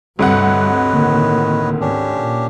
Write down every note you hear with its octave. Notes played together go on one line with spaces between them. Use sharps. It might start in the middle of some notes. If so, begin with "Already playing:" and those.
D2 G2 C3 G3 B4 C#5 D#5 F#5
A2 D3 D#3 A#3
G#2 C#4 D4 G4
A#2